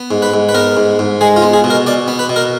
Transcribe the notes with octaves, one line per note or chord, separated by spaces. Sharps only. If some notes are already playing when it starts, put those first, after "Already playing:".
Already playing: B3
G#2
B4
G#2
B4
B3 A#4
G#2
G#2
G#3 G#4
F4
B3
G#4
B2
A#4
B2 D5
B3
B4
B2
A#4